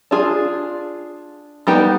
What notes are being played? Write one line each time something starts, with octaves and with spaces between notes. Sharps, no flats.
D4 F4 G#4
G3 B3 D#4 G4